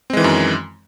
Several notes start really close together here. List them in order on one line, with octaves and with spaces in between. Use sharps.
C4 G#3 E3 D#3 F#2